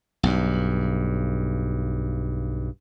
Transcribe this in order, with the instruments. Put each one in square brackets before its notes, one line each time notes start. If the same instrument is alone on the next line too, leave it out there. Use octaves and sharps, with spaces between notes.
[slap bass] B1 G2